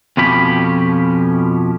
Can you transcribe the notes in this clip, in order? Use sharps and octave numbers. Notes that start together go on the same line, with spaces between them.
F2 B2 F3 C#4 G4 B5